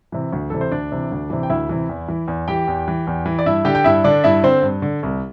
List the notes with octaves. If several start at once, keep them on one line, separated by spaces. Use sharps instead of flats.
C3 E3
D2
C3 E3 A4
C5
D2 D4 D5
C3 E3
D2
C3 E3
G5
D2 E4 E5
C3 E3
E2
E3
E2
E3 G4 G5
E2
E3
E2
E3
D5
G2 E4 E5
D3 G4 G5
G5
G2 E4 E5
D3 D4 D5
G2 E4 E5
D3 C4 C5
G2
D3
C2